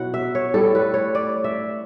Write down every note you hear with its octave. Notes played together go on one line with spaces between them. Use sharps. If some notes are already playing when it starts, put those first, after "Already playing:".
Already playing: B2 F#3 E4 F#4 F#5
E5
C#5
A2 G3 A4
B4
C#5
D5
E5